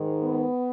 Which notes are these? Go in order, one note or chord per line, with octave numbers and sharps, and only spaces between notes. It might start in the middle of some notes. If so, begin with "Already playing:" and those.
Already playing: G#2 D#3
B3